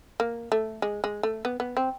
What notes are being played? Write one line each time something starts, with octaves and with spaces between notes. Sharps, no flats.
A#3
A3
G#3
G#3
A3
B3
B3
C4